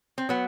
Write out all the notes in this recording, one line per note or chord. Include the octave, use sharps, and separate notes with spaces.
C4
F#3 B3